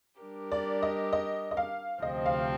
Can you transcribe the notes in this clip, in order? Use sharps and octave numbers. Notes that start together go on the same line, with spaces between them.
G3 D4 G4 A#4
D5
D#5
D#5
D#5
F5
D2 C3 F3 C4 G4 D#5
F5